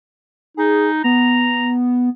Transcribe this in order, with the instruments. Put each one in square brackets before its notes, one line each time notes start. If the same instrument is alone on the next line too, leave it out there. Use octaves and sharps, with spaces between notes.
[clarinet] D#4 [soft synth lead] G#4
[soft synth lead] B3 [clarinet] A#5